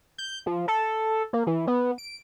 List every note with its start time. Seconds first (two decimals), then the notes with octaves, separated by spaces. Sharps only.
0.18 G6
0.46 F3
0.68 A4
1.33 A#3
1.47 E3
1.67 B3
1.98 D7